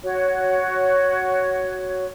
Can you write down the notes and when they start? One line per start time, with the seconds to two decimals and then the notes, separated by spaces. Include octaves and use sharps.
0.03 F#4 C#5